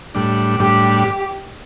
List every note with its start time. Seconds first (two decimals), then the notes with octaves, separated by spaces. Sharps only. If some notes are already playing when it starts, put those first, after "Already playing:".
0.15 A2 G3 D4
0.60 A2 G3 D4 G4